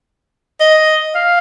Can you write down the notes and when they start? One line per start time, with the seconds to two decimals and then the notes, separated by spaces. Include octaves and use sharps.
0.60 D#5
1.15 F5